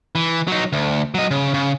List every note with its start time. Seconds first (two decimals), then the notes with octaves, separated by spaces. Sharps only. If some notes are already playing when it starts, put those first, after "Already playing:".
0.15 E3
0.48 F#3 D#4
0.73 D2
1.15 F#3 D#5
1.31 C#3
1.54 C#3